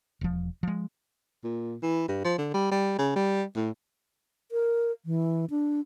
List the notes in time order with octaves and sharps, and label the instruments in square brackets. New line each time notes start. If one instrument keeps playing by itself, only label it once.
[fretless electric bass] E1 F3
F3 G#3
[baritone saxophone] A#2
E3
G2
F3
D3
G3
G3
C#3
G3
A2
[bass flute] A#4
E3
D4